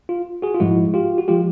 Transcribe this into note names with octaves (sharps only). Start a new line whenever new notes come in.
F4
F#4 G#4
F4
G#2 F3 G#3 E4 F#4
F4 G4
F#4
F3 G#3 F4 G4